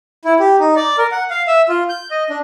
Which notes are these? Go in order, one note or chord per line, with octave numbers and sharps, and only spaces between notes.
E4
G4
D#4
D5
A#4
F#5
F5
E5
F4
G6
D#5
D4